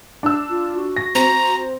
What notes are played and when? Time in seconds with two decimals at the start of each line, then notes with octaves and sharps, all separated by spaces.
0.23 D4 E6
0.50 F4
0.76 F#4
0.96 A#6
1.15 C4 A#5